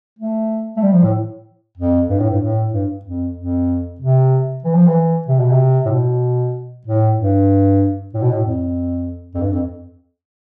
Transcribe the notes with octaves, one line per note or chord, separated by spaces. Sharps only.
A3
A3
G3
F3
A2
F2
G2
A2
G2
A2
G2
F2
F2
C3
E3
F3
E3
C3
B2
C3
A2
B2
A2
G2
A2
B2
A2
F2
F2
G2
F2